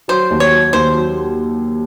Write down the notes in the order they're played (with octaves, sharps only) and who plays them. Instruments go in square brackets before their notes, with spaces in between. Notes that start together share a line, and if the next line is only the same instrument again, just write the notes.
[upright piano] F#3 [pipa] C5
[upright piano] D#2
[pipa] C#5
[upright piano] F#3
[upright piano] D#2 [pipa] C5
[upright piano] F#3